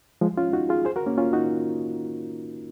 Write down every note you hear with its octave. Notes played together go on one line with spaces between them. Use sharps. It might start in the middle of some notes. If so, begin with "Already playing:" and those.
F3 G#3
C#4 F4
D#4 F#4
F4 G#4
G#4 C5
F#4 A#4
A#3 C#4
C#4 F4
D#4 F#4